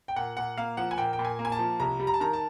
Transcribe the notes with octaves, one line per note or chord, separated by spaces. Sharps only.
G5
A#2 F#5
A#2 F#5
A#3 F5
F3 F#5
G#5
A#2 G5
G5
A#2
G#5
A#3
G#5
A5
F3
C2 A#5
G3
A#5
A5
D#3 A#5
A5